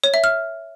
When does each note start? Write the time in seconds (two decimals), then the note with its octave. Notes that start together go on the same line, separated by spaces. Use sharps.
0.04 C#5
0.14 E5
0.24 F6